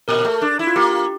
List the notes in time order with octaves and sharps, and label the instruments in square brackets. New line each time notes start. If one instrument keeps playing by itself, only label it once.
[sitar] A#2 [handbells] A#4
[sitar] A3
D4
E4
[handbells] F4
[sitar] A#3 [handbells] G4